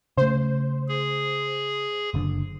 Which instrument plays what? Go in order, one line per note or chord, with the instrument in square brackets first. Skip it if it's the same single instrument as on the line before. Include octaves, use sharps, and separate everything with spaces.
[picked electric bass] C#3 A3 [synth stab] C5
[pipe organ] G#4
[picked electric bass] F#1 D3